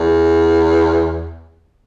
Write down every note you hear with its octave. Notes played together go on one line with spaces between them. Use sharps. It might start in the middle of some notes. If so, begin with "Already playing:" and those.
Already playing: E2